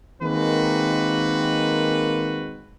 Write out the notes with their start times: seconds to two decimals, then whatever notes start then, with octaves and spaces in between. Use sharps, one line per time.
0.21 D#3 G#3 A#3 C4 F#4 B4